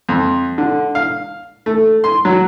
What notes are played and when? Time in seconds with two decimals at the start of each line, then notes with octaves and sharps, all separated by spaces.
0.09 F2
0.58 D3
0.95 F5
1.66 A3
2.04 C6
2.25 F#3